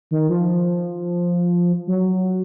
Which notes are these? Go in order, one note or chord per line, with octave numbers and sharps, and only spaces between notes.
D#3
F3
F#3